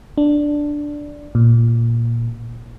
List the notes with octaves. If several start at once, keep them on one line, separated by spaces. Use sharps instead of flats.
D4
A#2